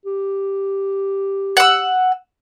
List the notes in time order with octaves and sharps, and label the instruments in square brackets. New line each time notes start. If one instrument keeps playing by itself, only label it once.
[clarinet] G4
[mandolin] F#5 E6